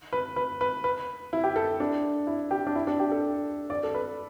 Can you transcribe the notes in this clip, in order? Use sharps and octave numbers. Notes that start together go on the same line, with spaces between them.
B4
B4
B4
B4
E4
G4
A4
D4
E4
G4
D4
E4
D4
G4
A4
D5
A4
B4